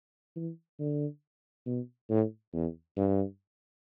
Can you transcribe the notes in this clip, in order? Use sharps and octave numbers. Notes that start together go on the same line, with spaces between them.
E3
D3
B2
A2
E2
G2